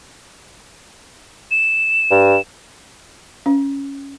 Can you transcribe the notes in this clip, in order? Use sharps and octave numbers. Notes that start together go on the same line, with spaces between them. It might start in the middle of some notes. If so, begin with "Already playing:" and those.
E7
G2
C#4